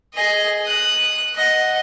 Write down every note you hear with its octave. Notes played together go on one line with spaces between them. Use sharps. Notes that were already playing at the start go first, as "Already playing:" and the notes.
G#4 D#5
D#6 F#6
D#5 F#5